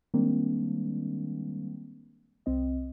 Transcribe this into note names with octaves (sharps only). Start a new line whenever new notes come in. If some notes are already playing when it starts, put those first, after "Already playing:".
D#3 G3 G#3 A#3 C4 D4
C2 C4 D#5